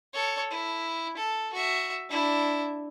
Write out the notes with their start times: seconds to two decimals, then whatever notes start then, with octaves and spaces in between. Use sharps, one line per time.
0.14 A4 C#5
0.50 E4
1.17 A4
1.53 F#4 E5
2.09 D4 E4